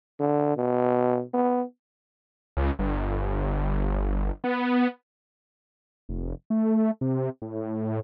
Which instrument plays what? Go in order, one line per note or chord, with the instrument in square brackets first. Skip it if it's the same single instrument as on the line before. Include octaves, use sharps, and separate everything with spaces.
[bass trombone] D3
B2
B3
[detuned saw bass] C#2
G1
B3
F1
A3
C3
A2